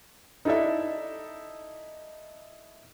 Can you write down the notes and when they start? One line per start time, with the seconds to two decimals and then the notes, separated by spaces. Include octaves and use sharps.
0.45 D#4 E4 A4 D5 E5